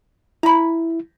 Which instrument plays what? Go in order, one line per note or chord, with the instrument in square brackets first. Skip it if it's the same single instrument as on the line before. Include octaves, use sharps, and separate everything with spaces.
[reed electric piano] E4 [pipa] A#5 B5